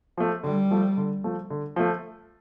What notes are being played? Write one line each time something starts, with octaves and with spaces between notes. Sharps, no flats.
F3 A3
D3 G3
F3 A3
D3
F3 A3
D3
F3 A3